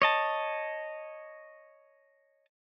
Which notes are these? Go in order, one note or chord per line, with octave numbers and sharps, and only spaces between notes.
C#5 D#5 A5